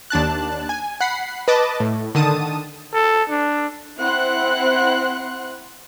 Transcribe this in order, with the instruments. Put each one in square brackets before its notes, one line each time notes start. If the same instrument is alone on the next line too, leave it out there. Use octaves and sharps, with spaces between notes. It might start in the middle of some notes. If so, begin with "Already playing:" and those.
[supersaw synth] D#2 D4 A5 F#6
G#5
F#5 B5 C7
B4 D#5 A5 D6
A2
D3 D#3 A5 D#6 D#7
[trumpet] A4
D4
[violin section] C4 E4 F#5 C6 F#6